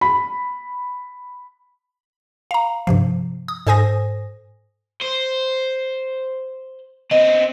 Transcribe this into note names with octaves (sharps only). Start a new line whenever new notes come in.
B5
F5 A#5
G2 C3 F3
D#6
G#2 A4 C5 G#5 D#6 A#6
C5
B3 C4 D#5